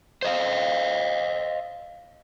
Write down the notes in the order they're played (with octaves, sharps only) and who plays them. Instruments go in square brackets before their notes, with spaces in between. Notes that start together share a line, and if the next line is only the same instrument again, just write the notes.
[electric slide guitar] C5 D#5 F5